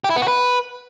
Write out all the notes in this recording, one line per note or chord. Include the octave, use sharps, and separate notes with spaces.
G4
E4
B3
F#4
B4